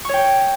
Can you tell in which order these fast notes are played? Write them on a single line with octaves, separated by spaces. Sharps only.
C#6 C#5 G5